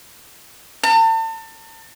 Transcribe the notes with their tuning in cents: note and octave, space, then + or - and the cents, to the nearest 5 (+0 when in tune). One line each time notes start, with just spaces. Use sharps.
A5 +40